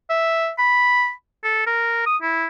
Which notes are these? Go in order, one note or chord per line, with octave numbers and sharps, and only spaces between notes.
E5
B5
A4
A#4
D#6
E4